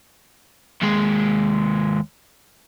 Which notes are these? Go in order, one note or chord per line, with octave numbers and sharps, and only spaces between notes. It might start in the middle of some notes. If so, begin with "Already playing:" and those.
D#2 G#3